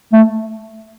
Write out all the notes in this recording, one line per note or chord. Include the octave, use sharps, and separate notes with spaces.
A3